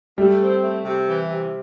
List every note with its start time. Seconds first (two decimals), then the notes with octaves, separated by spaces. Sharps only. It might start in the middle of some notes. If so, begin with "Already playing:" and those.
0.18 G3 A3
0.40 C4
0.62 A3
0.85 C3
1.08 E3
1.29 C3